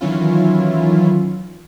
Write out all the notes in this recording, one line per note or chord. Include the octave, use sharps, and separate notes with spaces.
D#3 E3 F#3 C#4 E4 F4